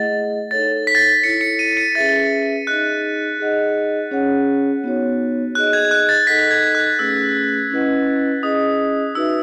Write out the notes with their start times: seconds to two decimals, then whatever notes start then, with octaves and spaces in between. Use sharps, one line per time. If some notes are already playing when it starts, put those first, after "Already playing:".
Already playing: A3 E4 G#4 D#5 F#5 A6
0.51 D#4 A4 C#5 A6
0.87 B6
0.95 A6
1.02 B6
1.23 E4 A4 C#5 C#7
1.41 C#7
1.59 D#7
1.77 C#7
1.95 C#4 G#4 B4 E5 A6
2.67 D#4 G#4 D#5 F#6
3.39 D#4 G#4 D#5 F#5
4.11 C#4 G#4 C#5 F#5
4.84 B3 D#4 F#4 C#5
5.55 D#4 G#4 D#5 F#6
5.73 G#6
5.91 F#6
6.09 A6
6.27 D#4 A4 D#5 F#5 B6
6.51 G#6
6.75 F#6
6.99 A3 C#4 G#4 B4 E6
7.71 C#4 E4 B4 D#5 F#5
8.43 C#4 E4 G#4 D#5 D#6
9.15 D#4 F#4 B4 E5 E6